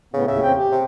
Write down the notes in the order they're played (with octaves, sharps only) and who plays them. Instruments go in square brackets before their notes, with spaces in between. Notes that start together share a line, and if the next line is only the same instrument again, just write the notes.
[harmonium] A2 B3 [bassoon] C#3
[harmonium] D#2 A2 E5 [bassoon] C#3
[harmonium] F2 C4 G5
G4
[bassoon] C3